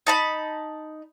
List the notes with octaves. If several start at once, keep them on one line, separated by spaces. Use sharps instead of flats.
D#4 A5 B5